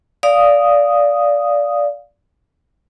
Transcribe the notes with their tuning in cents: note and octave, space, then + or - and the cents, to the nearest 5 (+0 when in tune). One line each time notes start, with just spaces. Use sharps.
D5 -15 F5 +0 D#6 +0